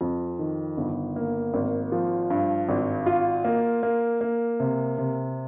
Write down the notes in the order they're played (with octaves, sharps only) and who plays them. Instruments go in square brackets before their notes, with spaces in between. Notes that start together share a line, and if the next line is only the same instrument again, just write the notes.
[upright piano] F2
D#3
G1
A#3
G#1
F3
G2
G#1
F4
A#3
A#3
A#3
C3
C3